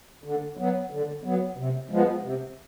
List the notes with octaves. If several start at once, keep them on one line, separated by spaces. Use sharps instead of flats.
D3
F#3 B3
D3
F#3 B3
C3
F3 G#3 B3
C3